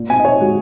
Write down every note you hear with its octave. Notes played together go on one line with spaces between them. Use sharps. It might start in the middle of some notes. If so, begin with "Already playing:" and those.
Already playing: A#2
C4 G#5
D#5
D#4 C#5
G#3 F#4